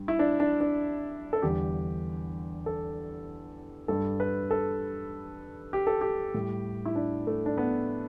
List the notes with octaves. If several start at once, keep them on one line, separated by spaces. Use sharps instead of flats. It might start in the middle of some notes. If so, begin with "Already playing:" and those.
Already playing: G2 G3
E4
D4
D4
D4
A4
E2 D3 G3 G4
A4
G2 G3 A4
B4
A4
G4
A4
G4
A2 G3
E4
D4
A3
D4
B3